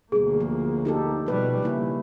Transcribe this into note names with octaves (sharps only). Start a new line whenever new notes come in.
D2 B2 G3 A#3 G#4
F3
D#4 G4 A4
B2 F3 G3 B4
C#3 G3 A#3 E4